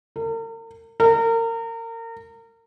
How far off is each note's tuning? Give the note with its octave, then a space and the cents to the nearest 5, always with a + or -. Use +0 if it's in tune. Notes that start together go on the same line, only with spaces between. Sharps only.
A#4 -40
A#4 -30